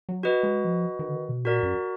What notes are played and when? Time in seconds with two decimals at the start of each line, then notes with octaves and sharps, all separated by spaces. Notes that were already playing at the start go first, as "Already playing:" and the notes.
0.09 F#3
0.23 F#4 B4 D#5
0.43 G#3
0.65 F3
0.99 D#3
1.08 D3
1.15 D#3
1.29 B2
1.44 A#2 F#4 A#4 D5
1.63 F#2